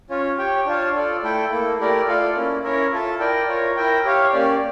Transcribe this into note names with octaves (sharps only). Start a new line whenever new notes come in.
C#4 F4 C#5
G4 C#5 G5
D4 F4 C#5 F5 A5
F4 A4 D5
A3 E4 A4 E5 G5
A#3 E4 A4
A3 E4 G4 A#4 D5
F4 A4 D5 F5
A#3 C#4 E4
C#4 E4 A#4 C#5 E5
F4 A4 E5 A5
E4 A#4 D5 G5
F4 A#4 C#5
E4 A#4 E5 G5
G4 C#5 F5
A#3 C#4 G4 D5